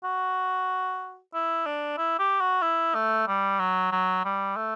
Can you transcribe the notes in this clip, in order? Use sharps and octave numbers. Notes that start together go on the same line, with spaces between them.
F#4
E4
D4
E4
G4
F#4
E4
A3
G3
F#3
F#3
G3
A3